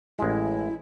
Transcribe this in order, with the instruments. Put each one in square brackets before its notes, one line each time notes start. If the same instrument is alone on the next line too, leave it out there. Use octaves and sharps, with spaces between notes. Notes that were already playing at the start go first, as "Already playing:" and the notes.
[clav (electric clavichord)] A1 G#3 [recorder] E4